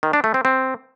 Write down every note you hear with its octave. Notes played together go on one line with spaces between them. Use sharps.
D#3
D4
A3
C4
C4